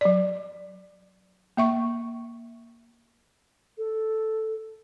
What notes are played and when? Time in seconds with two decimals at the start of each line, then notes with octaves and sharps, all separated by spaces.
0.01 F#3 D5
1.57 A#3 E5 C#6
3.78 A4